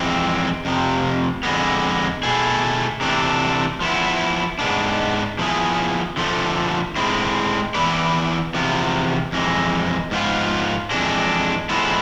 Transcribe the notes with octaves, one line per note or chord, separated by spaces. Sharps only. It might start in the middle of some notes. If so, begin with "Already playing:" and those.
Already playing: F2 E3 G#3 C4
F2 C3 F3
F2 D3 G#3 B3
B2 A3 E4 G#4
C3 E3 A3 D4
F3 B3 E4
G#2 G#3 B3 D4
F3 B3 E4 G#4
D3 F3 A3
A2 G#3 C4 E4
E3 B3 E4 B4 D5
E2 C3 F3 B3
F2 E3 G#3
G#2 F3 B3 F4
F2 E3 G#3 D4
A2 F3 G#3 B3 E4